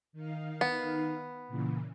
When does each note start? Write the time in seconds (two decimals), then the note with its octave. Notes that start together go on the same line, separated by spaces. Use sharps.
0.13 D#3 D#4 F5
0.61 B3
1.48 A#2 C#3 E3